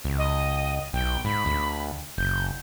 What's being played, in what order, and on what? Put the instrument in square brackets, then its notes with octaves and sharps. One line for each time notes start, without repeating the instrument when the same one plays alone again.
[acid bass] C#2
[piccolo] D#5
[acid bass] B1 [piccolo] G5
[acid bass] G#2 [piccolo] B5
[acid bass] D2
[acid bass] F#1 [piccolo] G6